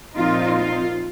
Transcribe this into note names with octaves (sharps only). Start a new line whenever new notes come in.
A#2 F3 C4 D#4 F4
F4